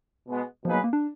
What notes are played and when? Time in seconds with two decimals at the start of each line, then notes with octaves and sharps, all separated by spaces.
0.28 B2 G#3 B3
0.65 B2 F3 A#3 D#4 G#4 B4
0.74 F#3
0.84 A#3
0.93 D4